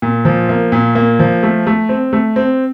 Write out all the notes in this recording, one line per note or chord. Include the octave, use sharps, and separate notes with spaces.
A#2
F3
A#3
A#2
A#3
F3
A3
A3
C4
A3
C4